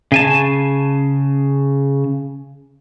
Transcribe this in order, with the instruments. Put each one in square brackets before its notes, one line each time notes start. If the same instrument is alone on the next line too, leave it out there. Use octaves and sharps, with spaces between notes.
[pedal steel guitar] C#3 G#5 A5